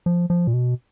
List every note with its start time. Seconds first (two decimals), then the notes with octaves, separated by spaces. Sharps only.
0.06 F3
0.30 F3
0.47 A#2
0.53 B2